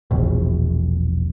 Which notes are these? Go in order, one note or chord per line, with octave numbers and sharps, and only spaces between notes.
E1 A#1